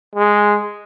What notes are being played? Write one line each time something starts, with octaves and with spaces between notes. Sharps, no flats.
G#3